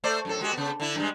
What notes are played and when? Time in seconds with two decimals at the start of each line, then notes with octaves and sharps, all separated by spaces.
0.04 A3 C5 D5
0.25 F#2 A2 A4
0.41 G#3 F#4 G4
0.53 C#3 B3
0.80 D3 E4
0.96 G2 G3 G#3